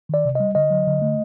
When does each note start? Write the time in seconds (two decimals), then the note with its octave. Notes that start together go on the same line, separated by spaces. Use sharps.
0.09 D#3 D5
0.25 C3
0.35 G3 D#5
0.55 D3 D#5
0.70 F#3
0.87 D3
1.02 A3